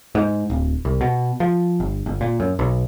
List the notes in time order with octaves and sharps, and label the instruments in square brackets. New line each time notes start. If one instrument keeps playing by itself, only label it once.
[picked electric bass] G#2
D1
C2
B2
F3
G1
G1
A#2
F#2
B1